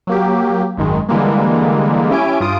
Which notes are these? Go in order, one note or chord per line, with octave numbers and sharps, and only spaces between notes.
F#3 A#3 G4
G#1 F#2 D#3 G#3
D3 E3 G3 G#3 A#3
C#4 E4 G4 G#5 D7
G2 F4 D#6 D7